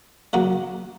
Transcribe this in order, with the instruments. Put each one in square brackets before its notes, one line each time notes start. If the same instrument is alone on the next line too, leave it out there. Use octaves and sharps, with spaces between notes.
[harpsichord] C#3 F#3 A#3 F#4